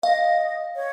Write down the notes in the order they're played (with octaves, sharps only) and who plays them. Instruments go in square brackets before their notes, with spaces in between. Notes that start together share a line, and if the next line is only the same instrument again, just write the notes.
[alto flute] D#5 [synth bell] F5
[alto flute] C#5